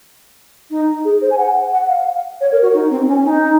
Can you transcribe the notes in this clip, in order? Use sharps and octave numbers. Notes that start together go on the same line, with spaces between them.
D#4
G#4
C5
G#5
F#5
F#5
F5
C#5
A#4
F#4
D#4
C4
C#4
D#4